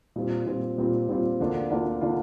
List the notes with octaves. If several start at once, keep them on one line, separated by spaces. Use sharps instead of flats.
A#2 G3 C4 F4
A#2 G3 C4 F4
A#2 G3 C4 F4
A#2 G3 C4 F4
D2 D3 A#3 D4 F4
D2 D3 A#3 D4 F4
D3 A#3 D4 F4